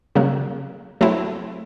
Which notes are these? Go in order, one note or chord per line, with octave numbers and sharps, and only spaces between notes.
C#3 F#3 A#3
F#3 A3 C4 E4